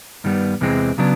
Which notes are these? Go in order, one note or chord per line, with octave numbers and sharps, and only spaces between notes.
G2 D#3 G3 B3
E2 C3 E3 G#3 C4
C#3 F#3 B3 D4